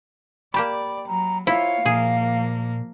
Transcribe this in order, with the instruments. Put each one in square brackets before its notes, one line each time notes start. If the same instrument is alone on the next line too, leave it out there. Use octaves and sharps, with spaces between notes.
[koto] A#3 G4 A5 [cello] D5 [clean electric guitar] G5 B5
[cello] F#3 [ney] A#5
[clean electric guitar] A#3 C5 [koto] E4 [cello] F4 C#5 [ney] F5
[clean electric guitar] A#2 [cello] F3 A#3 [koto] G#4